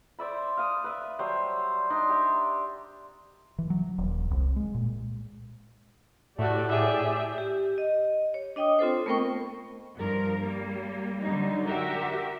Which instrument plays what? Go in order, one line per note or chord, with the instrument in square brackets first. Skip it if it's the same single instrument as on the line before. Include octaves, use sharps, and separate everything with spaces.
[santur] C5 D5 E5 B5
F5 D#6
B4 E5
F#3 G3 C5 E5
D4 D#4 C6
G4 E5
[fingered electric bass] E3
F#3
D#1
C2
G#3
A#2
[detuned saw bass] A2 [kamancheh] A3 F#4 [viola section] G4 D5
[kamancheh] G#4 G5 [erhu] E5
[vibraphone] G4
D#5
C#5
D4 D#5 G5 D6 D#6
C4 F4 A4 C5
A3 B3 A#4 C5 G5 C#6
[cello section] G2 F3 A#4
G3 A#3
D3 F#3 G3 D#4
F#4 G4 A#4 E5